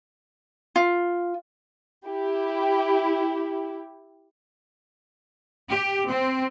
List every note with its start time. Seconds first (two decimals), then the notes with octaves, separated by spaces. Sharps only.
0.76 F4
2.05 E4 G4
5.69 G4
6.06 C4